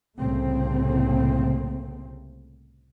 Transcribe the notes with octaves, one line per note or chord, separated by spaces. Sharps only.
C2 A2 C#3 A3 A#3 C4